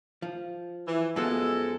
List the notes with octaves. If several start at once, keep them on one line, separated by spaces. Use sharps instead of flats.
F3
E3
F#2 F3 G#3 B3 A4